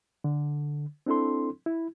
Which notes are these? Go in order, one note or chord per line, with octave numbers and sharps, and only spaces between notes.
D3
C4 D4 E4 A4 C6
E4